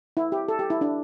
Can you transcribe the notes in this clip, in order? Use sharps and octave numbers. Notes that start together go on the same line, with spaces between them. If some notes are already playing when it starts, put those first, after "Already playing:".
E4
G4
A4
G4
E4
D4